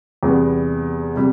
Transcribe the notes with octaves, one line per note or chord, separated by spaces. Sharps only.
E2 C3 G3 B3
C3 G3